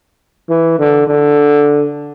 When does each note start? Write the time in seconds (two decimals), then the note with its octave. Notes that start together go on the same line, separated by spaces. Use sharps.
0.49 E3
0.79 D3
1.07 D3